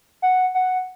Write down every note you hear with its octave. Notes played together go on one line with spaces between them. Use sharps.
F#5
F#5